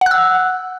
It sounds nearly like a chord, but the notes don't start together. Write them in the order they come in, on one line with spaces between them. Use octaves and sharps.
F#5 F#6 E6